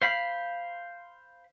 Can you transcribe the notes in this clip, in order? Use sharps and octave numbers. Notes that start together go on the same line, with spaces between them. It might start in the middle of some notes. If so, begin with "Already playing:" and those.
C5 F5 B5